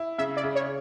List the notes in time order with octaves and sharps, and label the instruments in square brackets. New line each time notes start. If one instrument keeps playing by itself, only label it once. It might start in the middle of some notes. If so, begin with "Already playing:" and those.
Already playing: [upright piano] E4
[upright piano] C#3 [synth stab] E5
[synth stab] D5
[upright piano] C#3
[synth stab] C#5